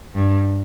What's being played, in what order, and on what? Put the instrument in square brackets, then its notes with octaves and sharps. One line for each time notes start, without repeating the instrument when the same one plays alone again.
[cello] G2